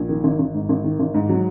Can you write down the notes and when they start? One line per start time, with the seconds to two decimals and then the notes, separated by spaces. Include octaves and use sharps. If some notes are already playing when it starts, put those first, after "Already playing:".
Already playing: A#1
0.09 D#3
0.24 G#1
0.39 G#1
0.54 G#2
0.69 G#1
0.84 D#3
0.99 G#1
1.14 G#2
1.29 F#3